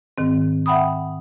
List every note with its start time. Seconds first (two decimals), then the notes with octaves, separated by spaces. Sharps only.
0.18 G#2 D#3 C4
0.66 E5 F#5 G5 B5 D#6